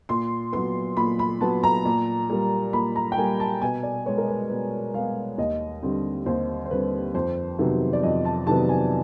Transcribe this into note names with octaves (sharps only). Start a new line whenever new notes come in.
A#2 C6
F#3 B3 C6
A#2 B5
B5
F#3 B3 A5
A#5
A#2
G3 A#3
A#2 B5
A#5
G5
G3 A#3 G#5
A5
B2 G#5
D5
G#3 B3 C#5
A#4
B4
B2 B4
G#3 B3 F5
D#2 D#5
D3 G3 C4
D#2 C5
C5
D3 G3 C4 B4
F2 C5
C3 D#3 F#3 B3
D5
F2 D#5
A5
C3 D#3 F#3 B3 A5
G#5